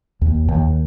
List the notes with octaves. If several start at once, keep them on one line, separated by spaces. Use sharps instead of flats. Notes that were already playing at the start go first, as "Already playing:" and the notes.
D#2
D#2